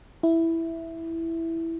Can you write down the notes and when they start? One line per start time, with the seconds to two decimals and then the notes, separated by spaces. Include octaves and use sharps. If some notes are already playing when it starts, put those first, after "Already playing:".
0.23 E4